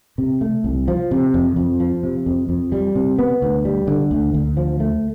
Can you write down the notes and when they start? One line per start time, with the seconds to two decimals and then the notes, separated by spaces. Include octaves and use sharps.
0.18 C3
0.41 A3
0.64 C2
0.88 F3
1.11 C3
1.34 F2
1.56 F2
1.80 F3
2.03 C3
2.26 F2
2.49 F2
2.72 G3
2.95 C3
3.19 B3
3.42 D2
3.65 G3
3.87 D3
4.11 D2
4.34 D2
4.57 F3
4.80 A3